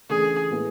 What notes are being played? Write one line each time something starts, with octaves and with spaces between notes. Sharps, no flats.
C#3 E3 A3 D4 G#4
A2 G#3 B3 E4